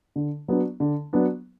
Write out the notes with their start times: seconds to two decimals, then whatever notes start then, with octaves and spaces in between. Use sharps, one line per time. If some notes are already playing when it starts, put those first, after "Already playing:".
0.16 D3
0.48 F#3 B3 D4
0.80 D3
1.13 F#3 B3 D4